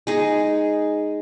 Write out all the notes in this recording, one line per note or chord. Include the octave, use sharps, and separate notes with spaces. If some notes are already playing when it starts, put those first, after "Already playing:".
G#3 D#4 G#4